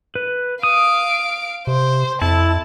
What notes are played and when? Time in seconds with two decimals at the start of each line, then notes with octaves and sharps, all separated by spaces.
0.15 B4
0.63 F5 D#6 D7
1.67 C3 C5
2.22 F2 E4 A5